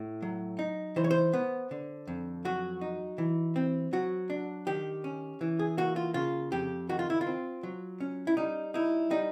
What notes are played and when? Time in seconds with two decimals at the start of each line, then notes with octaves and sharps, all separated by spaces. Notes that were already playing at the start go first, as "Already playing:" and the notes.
Already playing: A2
0.22 F#3
0.59 D#4
0.96 E3 C5
1.04 C#5
1.11 C5
1.33 B3
1.71 D3
2.08 F2
2.45 F#3 F#4
2.81 D#4
3.18 E3
3.56 C4
3.93 F#3 F#4
4.30 D4
4.67 D#3 G4
5.04 C#4
5.41 E3
5.59 G#4
5.77 A#3 F#4
5.96 F4
6.14 C#3 F4
6.52 F2 G4
6.89 D#3 F#4
6.99 F4
7.10 E4
7.21 F4
7.27 C4
7.63 F#3
8.00 C#4
8.27 E4
8.37 G3 D#4
8.74 D#4 E4
9.11 G3 D#4